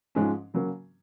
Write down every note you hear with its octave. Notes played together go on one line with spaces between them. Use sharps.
G#2 F3 G#3 C#4
C#3 F#3 A#3